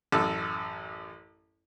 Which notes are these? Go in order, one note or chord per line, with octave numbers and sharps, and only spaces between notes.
A1 F#2 A4